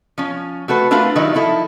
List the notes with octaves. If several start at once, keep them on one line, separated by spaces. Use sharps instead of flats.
F3 C#4
A3 F#4 A4 B4
A3 D4 F4 A#4 B4 F5
D#3 F#3 G3 D#4 E4
F3 D#4 E4 A4